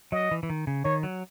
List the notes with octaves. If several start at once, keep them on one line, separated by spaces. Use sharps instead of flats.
F#3 D#5
E3
E3
D#3
C#3
D#3 C#5
F#3